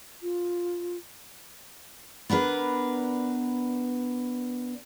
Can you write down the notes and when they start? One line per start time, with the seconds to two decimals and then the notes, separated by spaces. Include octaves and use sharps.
0.22 F4
2.30 B3 D4 A#4 B4